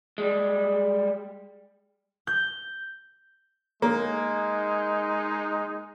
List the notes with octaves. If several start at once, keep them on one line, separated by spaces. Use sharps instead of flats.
G3 G#3
G6
G#3 A#3 D#4